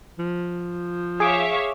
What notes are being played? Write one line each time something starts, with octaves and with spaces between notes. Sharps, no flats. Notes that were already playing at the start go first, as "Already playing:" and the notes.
F3
G#4 C#5 E5 F5 D6